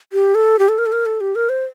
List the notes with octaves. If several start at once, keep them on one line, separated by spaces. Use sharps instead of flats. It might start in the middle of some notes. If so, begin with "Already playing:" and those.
G4
A4
G4
A4
A#4
A4
A#4
A4
G4
A#4
C5